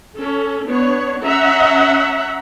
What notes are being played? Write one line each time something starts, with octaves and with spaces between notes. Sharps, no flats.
C#4 A4
B3 D4 C#5
C#4 E5 F#5 A#5